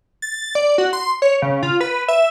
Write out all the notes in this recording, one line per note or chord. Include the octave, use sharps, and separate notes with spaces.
A6
D5
F#4
C6
C#5
C#3
F4
B4
E5